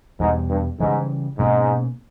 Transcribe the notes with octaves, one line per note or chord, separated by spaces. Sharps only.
E2 G#2 B2 G3
G2
G#2 C#3 E3 G3
G#2 B2 A#3 C#4